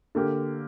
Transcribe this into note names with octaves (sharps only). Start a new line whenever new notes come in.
D3 A#3 G4